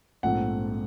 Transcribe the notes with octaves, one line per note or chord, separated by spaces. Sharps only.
A#1 G#2 F3 A3 C4 F#5